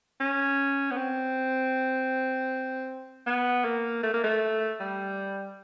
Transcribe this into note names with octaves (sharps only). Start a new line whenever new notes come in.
C#4
B3
C4
B3
A#3
A3
A#3
A3
G3